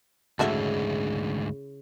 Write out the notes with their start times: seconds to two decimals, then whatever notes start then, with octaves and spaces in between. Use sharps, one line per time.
0.39 D2 G#2 C#3 A3 E4 F#4 E5